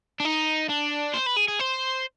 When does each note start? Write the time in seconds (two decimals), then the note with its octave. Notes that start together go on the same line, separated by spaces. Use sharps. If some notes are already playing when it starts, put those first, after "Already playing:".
0.20 D4
0.25 D#4
0.69 D4
1.14 C5
1.27 B4
1.37 G#4
1.48 G#4
1.60 C5